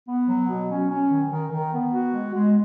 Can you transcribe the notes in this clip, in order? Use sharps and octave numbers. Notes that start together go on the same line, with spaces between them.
B3
F#3
B2
C#4
C#4
D#3
D#3
D#3
B3
F#4
G#3
G#3